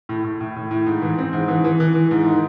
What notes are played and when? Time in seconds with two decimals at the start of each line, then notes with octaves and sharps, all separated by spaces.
0.09 A2
0.24 A2
0.40 A2
0.56 A2
0.71 A2
0.87 G#2
1.02 E3
1.18 C4
1.33 G#2
1.48 E3
1.64 E3
1.80 E3
1.95 E3
2.11 G#2
2.27 D#3